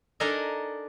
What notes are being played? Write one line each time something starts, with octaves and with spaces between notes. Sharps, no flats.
D4 D#4 A4 A#4 D#5 G#5